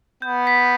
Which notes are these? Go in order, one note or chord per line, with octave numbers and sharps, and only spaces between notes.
B3 G6
B6